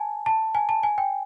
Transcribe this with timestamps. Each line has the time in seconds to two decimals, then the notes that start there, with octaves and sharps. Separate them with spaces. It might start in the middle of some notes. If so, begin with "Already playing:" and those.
Already playing: G#5 A5
0.26 A5
0.55 G#5
0.69 A5
0.83 G#5
0.98 G5